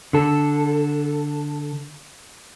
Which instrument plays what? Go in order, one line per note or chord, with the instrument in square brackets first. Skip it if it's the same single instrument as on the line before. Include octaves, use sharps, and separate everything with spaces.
[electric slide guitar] D3 A4